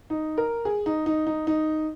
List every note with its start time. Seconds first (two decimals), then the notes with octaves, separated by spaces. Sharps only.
0.10 D#4
0.38 A#4
0.65 G#4
0.86 D#4
1.06 D#4
1.27 D#4
1.47 D#4